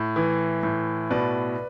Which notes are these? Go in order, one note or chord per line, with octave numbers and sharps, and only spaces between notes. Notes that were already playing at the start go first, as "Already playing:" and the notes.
Already playing: A2
E3
A2
B2 B4 D5